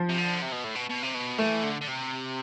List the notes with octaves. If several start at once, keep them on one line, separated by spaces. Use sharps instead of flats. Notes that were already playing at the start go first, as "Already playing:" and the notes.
Already playing: F3
C3
D3
C3
B2
A2
B2
B2
C3
B2
E3 A3
D3
D3
C3